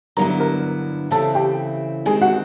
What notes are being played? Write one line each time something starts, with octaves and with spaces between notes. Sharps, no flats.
G2 D3 F#3 B3 E4 A#4 A#5
A#4 A#5
C#3 E3 A3 C4 E4 A4 A5
G4 G5
D#3 G#3 C4 G#4 G#5
F#4 F#5